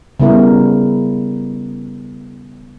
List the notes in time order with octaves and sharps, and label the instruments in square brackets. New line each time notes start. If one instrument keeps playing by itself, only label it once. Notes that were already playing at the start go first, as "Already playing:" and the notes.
[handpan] C#3 G3 B3 E4 A#4